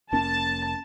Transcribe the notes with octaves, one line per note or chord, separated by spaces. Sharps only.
F1 A#3 C#4 A5